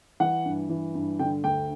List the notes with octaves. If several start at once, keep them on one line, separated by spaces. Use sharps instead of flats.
E3 F#5
G2
E3
G2
D3 G5
D2 G5